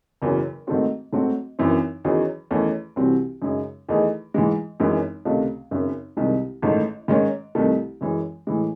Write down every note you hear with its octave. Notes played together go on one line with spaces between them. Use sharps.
F#1 E2 C#3 F#3
G#2 D#3 A3 C4 F#4
G#2 F#3 A3 C4 F#4
G#1 F#2 E3 C4 E4
E2 D#3 F#3 C#4 G#4
E2 D#3 A3 C#4
C2 C3 E3 C4 F#4
F#2 C#3 G#3 D#4 G#4
E2 D#3 A3 D#4 G#4
G#2 E3 G#3
G#1 F#2 E3 G#3 C#4
C#2 C3 D#3 A3
G#1 F#2 C#3
C2 C3 D#3 G#3 D#4
A1 G#2 D#3 A3
G#2 D#3 G#3 C#4
C2 C3 D#3 A3
F#2 E3 G#3 C#4 G#4
A2 E3 G#3